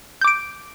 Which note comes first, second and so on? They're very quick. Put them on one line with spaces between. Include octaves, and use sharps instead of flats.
G6 D6 D7